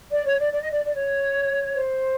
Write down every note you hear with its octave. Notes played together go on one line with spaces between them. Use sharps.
D5
C#5
D5
D5
D#5
D5
D5
C#5
C5